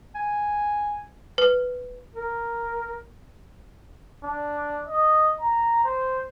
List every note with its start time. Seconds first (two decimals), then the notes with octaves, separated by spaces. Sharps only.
0.15 G#5
1.38 B4
2.15 A#4
4.24 D4
4.87 D#5
5.41 A#5
5.85 C5